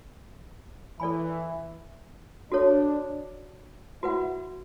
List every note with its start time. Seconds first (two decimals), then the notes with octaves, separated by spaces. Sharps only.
1.00 E3 A4 D5 G#5 B5
2.51 D4 F#4 A4 C#5
4.03 E4 F#4 B4 F#5